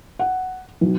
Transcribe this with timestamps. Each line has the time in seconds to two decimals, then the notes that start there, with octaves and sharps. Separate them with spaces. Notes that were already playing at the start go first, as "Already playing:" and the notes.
0.19 F#5
0.81 B1